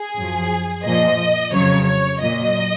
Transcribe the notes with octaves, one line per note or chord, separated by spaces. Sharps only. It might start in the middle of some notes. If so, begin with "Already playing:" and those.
Already playing: G#4
F#2 F3
A#2 F3 D#5
F2 C#3 F#3 C#5
C#5
A#2 F#3 D#5